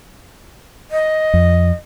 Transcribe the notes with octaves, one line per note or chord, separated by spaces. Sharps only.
D#5
F2